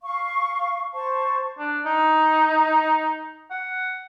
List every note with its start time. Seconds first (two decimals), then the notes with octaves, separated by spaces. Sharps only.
0.03 F5 C#6
0.93 C5 A5 C#6
1.59 D4
1.86 D#4
3.51 F#5